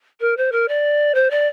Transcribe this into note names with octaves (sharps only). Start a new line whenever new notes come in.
A#4
C5
A#4
D5
C5
D5